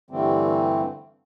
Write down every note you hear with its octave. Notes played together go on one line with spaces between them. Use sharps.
G2 D3 E3 G3 A3 C4